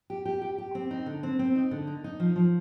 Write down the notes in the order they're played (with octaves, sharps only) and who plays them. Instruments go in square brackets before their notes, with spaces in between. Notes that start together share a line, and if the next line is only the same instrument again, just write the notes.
[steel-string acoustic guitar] G4
G4
G4
G4
C4
D#4
D3
C4
C4
D#4
D3
D#4
D#4
F3
F3